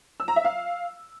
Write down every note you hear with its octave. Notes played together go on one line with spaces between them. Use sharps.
E6
A#5
E5
F5